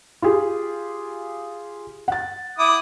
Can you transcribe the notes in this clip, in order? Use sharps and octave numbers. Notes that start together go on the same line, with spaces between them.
F4 G4 G#4
F#5 A6
E4 D6 D#6